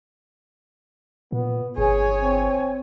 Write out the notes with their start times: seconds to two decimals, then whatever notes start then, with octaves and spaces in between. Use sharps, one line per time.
1.32 A#2 B3
1.78 G1 G#4 C#5 G#5
2.22 C4